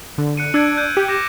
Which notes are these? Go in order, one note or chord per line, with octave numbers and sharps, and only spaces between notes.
D3
F#6 C#7 D#7
D4 E6 G#6 D7
F#6 G6 D#7
G4
D6 A#6 E7